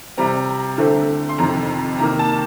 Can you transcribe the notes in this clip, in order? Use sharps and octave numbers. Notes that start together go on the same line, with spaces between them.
C3 G3 C4 A#5
D3 A3 C4
C6
F2 C3 D#3 A#5
C3 D#3 A#3 A#5
A5